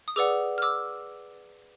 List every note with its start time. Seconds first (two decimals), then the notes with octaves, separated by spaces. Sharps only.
0.08 D#6
0.16 G#4 B4 D5 F#5 D6 E6
0.58 F6
0.62 D6 E6